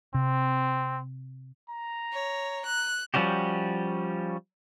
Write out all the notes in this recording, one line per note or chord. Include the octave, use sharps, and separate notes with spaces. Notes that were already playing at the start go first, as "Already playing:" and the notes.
C3 C4
A#5
C#5
F#6
F3 G3 C#4 F#4 G4